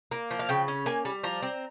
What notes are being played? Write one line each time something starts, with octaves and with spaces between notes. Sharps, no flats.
A#3
F3
F5
C#3 G5
C#4
A#3 G#5
G3
F3 A#5
C4